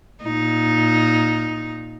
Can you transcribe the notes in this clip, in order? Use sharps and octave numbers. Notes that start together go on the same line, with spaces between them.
A#2 D#4